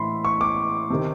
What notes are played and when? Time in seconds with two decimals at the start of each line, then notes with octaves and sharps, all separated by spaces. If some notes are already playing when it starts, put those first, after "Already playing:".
Already playing: A2 E3 B5 C6
0.24 C#6
0.41 D6
0.90 C3 D#3